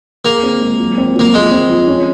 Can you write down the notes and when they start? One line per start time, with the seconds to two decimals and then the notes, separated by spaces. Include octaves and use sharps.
0.25 A#3 G#4
0.43 C4
0.61 G#3
0.79 F#3
0.98 C4
1.15 F#3 A#3
1.33 F3 G#3
1.51 C4
1.69 F3
1.88 C#4